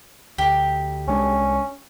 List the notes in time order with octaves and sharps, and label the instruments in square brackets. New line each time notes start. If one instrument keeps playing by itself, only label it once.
[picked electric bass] D2 [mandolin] G4
[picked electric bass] C2 G#3 D4 [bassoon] C#4